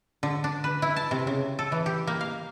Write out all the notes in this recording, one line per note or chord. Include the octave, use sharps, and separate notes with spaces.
D3
D4
B4
E4
A5
C3
C#3
A4
E3
G4
A#3
F5